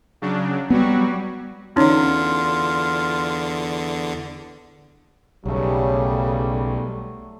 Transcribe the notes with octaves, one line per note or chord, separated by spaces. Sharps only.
C#3 F#3 D4
F#3 G3 B3 F#4
E2 D3 C#4 D#4 F4 C#5
B1 C#3 F#3 G3 A3